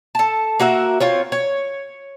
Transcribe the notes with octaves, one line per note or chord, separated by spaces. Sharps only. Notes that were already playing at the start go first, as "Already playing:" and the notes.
A4 A5
A#3 F#4 A#4 E5
C4 F4 C#5
C#5